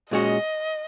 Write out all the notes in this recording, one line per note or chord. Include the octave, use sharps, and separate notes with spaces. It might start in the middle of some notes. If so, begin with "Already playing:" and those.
A#2 G#3 C#4 F#4 D#5